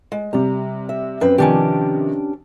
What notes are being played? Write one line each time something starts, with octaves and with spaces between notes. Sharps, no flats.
G#3
C3 G3 A#5
E5
F#2 C4 B4
C3 D#3 F3 C#4 D4 G4